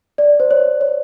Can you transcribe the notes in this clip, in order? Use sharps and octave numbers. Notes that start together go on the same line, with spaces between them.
D5
C5
C#5
C#5